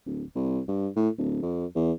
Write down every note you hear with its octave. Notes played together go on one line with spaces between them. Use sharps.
D1
C2
G2
A2
D1
F2
E2